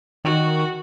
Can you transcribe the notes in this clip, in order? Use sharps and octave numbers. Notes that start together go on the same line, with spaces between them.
D#3 F#4